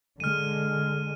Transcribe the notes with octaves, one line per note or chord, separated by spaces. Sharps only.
D3 G#3 F6 D#7